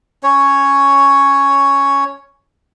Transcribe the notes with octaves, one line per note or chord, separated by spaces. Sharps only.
C#4 C#5